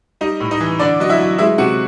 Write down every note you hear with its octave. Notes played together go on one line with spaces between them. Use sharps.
G3 D#4 D#5
A2
D#4 D#5
E3
D3 D4 D5
F#3 D#5
E4 E5
F#3
G#3 E4 E5
C3 F#4 F#5